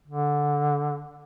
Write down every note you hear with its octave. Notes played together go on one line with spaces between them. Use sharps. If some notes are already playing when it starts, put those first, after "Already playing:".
D3